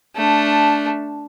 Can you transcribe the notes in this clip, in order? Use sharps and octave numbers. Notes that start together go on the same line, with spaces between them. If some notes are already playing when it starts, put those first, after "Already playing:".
A3 D4